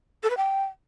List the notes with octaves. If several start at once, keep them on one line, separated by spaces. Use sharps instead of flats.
A4
B4
G5